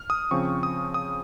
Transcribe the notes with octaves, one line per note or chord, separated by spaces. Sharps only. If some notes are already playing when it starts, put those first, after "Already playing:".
Already playing: F6
D#6
C#3 F3 C4 C#6
D#6
D#6